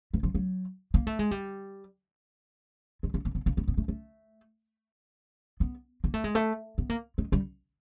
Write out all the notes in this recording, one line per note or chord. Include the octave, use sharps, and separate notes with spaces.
E3
F3
F#3
A#3
A3
G#3
G3
G#3
A3
A#3
B3
A#3
B3
B3
A3
A3
B3
A#3
A3
G#3
A3
B3
A#3
G#3
G3